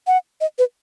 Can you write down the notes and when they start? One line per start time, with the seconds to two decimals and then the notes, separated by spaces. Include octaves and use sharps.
0.07 F#5
0.41 D#5
0.59 B4